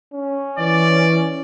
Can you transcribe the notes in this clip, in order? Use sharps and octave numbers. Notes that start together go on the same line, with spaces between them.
C#4
E3 D5